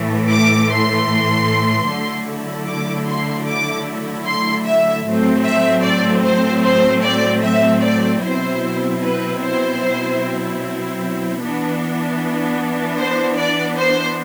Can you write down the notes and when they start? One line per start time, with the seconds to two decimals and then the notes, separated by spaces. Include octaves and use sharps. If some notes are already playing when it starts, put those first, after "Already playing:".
Already playing: A2 E3 A3
0.30 D6
0.70 C6
1.89 D3 F#3 A3 E4
2.68 D6
3.08 C6
3.47 D6
4.27 C6
4.66 E5
5.06 A2 F#3 A3 C4
5.45 E5
5.84 D5
6.24 C5
6.64 C5
7.04 D5
7.44 E5
7.83 D5
8.22 B2 F#3 C4 E4 C5
9.01 B4
9.42 C5
11.40 E3 B3 D4
12.99 C5
13.38 D5
13.77 C5